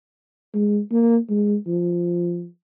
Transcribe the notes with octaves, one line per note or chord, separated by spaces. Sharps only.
G#3
A#3
G#3
F3